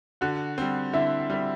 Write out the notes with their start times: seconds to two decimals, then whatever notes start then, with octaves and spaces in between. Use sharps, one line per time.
0.21 D3 F#4 F#5
0.58 G3 C4
0.93 D3 E4 E5
1.30 G3 C4